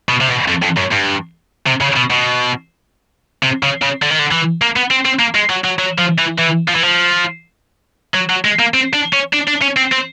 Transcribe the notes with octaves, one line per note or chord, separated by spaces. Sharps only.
B2
C3
B2
F2
F2
F#2
G2
C3
C#3
B2
B2
C3
C#3
C#3
D3
D#3
D3
E3
A#3
B3
C4
C4
A#3
G#3
F#3
F#3
F#3
F3
E3
E3
F3
E3
F3
F#3
F#3
G#3
A#3
C4
D4
C#4
D4
D4
C#4
C4
C4